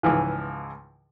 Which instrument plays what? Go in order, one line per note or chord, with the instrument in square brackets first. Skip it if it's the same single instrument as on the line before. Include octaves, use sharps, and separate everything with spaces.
[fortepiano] C#2 G#2 E3 F3